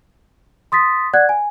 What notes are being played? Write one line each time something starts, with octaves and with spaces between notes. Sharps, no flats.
C6 D#6 A6 B6
D5 F#5 F#6 G#6
G#5